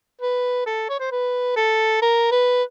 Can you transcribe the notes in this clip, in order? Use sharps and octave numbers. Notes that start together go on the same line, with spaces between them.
B4
A4
C#5
C5
B4
A4
A#4
B4